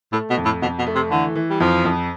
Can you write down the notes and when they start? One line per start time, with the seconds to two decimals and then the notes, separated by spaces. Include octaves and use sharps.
0.13 A2 A3
0.30 B2
0.37 F2
0.45 A2
0.62 F2 B2
0.79 B2
0.87 A3
0.95 C3
1.11 D3 E3
1.35 E3
1.50 G3
1.60 F2 F3
1.85 F2